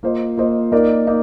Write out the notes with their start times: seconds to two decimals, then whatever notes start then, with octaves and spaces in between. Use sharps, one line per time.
0.03 A#3 F4 C5 D#5
0.37 A#3 F4 C5 D#5
0.72 A#3 D#4 A#4 D5
1.07 A#3 D#4